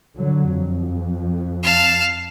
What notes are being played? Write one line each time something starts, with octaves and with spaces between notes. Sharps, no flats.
D3 F#3
F2
F5 A5